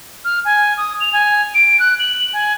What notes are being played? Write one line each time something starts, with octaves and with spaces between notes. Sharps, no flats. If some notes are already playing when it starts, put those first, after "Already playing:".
F6
G#5
D#6
F7
G#5
D7
F#6
F#7
G#5